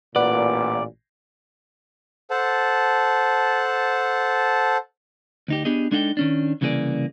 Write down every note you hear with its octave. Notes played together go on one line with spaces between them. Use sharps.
A1 A#2 B4 D5 F#5
A4 C5 F#5 A5
D2 D#4 G4
B3 D4 G4 G#4 D#5
G#3 D4 D#4 A4 F#5 G5
D#3 C#4 D4
C2 C#3 E3 A#3 G#4 D5